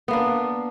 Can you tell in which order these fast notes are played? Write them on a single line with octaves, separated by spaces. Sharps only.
B3 A#3 D4